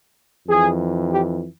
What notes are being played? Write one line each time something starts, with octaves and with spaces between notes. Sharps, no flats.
F2 E3 G#4
G4